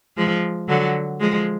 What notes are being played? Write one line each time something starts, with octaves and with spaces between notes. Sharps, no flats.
F3 G#3
D3 F#3
F3 G#3